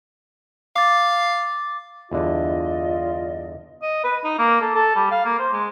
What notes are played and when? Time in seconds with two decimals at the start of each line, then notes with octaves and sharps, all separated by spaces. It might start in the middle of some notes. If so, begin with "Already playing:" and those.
0.76 F5 D6 A6
2.12 E2 G2 D3 F4 D5 D#5
3.82 D#5
4.04 B4
4.24 D#4
4.39 A#3
4.61 A4
4.75 A4
4.96 G3
5.11 F5
5.25 A#3
5.39 C5
5.53 G#3